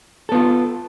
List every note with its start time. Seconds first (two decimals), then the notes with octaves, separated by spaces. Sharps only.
0.29 A4
0.32 B3
0.35 F4